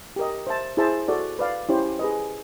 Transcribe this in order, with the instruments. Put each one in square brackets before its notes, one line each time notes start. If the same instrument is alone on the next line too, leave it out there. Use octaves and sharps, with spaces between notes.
[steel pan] G4 A#4 D#5
C5 E5 A5
E4 G#4 C5 E5 A5
F#4 A4 D5
B4 D5 F5
C#4 E4 G4 C5
G#4 B4 D#5